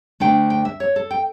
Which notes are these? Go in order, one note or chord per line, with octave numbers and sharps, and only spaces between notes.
D2 D3 A3 D4 G5
G5
E5
C#5
A4
G5